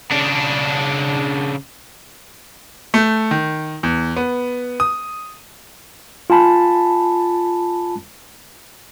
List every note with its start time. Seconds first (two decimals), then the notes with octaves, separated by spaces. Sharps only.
0.11 C#3 D4
2.94 A3
3.31 D#3
3.83 E2
4.16 B3
4.80 D#6
6.30 F4 G#5 A5 B5